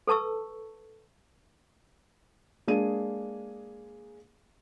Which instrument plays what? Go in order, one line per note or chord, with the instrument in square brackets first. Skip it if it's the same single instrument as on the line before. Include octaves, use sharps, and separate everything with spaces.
[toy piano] A4 B4 A5 C#6 E6
[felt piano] G#3 A#3 D4 G#4 D#7